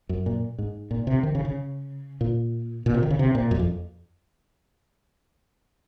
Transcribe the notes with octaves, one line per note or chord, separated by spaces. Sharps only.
F#2
A#2
G#2
A#2
C3
D#3
C#3
C#3
A#2
A#2
C3
D#3
C#3
C3
A#2
F#2
F2